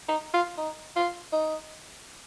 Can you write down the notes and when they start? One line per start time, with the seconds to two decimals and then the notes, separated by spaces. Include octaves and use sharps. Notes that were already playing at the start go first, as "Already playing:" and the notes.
0.09 D#4
0.34 F4
0.58 D#4
0.96 F4
1.33 D#4